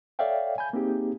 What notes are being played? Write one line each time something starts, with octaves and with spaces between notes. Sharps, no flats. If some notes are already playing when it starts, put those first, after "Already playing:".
A4 C#5 D5 E5 F5 G5
G#5 B5 G6
A#3 C4 D#4 G4 G#4